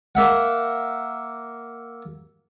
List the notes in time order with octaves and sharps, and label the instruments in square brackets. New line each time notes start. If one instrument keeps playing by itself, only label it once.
[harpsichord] A#3 E5 F#5